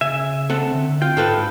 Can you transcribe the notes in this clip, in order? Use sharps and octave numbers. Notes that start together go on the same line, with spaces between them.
C#3 E5 G#5
C4 A4 F#5
D3
F4 G5
G#2 F4 A4 B4